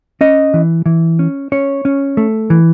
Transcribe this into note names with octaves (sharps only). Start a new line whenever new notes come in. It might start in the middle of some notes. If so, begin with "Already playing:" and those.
C#4 D#5
E3
E3
C#4
C#4 C#5
C#4
A3
E3